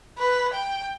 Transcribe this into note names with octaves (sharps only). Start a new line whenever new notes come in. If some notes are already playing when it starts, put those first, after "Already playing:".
B4
G5